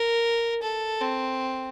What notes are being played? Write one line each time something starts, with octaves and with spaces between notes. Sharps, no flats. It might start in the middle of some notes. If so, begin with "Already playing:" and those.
Already playing: A#4
A4
C4